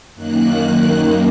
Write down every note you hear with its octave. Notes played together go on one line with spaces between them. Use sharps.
F#2 D#3 A#3 F#6